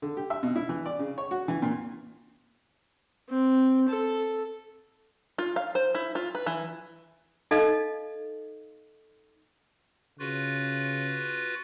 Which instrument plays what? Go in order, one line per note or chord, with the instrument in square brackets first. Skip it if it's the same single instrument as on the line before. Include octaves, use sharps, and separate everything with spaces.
[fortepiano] D3
G4
E5
B2
E4
E3
D5
C#3
C#5
F#4
E3
A#2
[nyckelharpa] C4
A4
[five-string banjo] F4
F5
C5
E4
F4
B4
E3
[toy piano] D#4 A4 D#5 F5
[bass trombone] C#3 [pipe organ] F4 F#4 B4